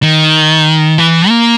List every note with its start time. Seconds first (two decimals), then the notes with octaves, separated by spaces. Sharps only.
0.03 D#3
0.98 E3
1.29 A#3